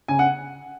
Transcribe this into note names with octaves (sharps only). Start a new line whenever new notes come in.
C#3 G#5
F#5